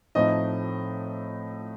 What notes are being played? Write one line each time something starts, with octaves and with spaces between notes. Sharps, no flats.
A2 F3 A3 C4 D#4 D#5